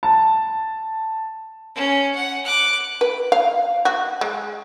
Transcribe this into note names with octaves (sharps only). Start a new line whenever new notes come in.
A5
C#4
F#5
D6 F#6
B4
F5
F#4
G#3